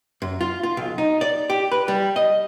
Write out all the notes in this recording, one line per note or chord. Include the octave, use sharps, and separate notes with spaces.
F#2
F4
F4
B1
D#4
D5
G4
B4
G3
D#5